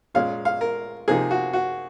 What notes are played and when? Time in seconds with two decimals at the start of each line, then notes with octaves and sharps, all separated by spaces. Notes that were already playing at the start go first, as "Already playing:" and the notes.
0.14 A#2 G#3 C#4 F5
0.45 F5
0.61 A#4
1.08 C3 F3 A#3 D#4 G#4
1.31 F#4
1.53 F#4